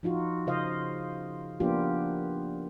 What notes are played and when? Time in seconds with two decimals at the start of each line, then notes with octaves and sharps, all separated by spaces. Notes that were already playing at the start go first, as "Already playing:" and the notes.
0.03 F3 D#4 F4 F#4
0.47 C#3 F4 C5 D#5 F5
1.60 F3 A#3 B3 D4 F4 G4